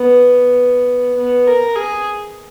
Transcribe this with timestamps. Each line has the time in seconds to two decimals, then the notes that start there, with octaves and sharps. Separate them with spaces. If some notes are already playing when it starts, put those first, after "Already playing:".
Already playing: B3
1.18 B3
1.47 A#4
1.75 G#4